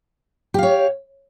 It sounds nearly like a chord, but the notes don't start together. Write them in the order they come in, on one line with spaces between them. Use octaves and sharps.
G4 F5 C#5